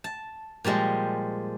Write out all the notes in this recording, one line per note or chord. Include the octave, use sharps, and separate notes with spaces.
A5
A#2 F3 G3 G#3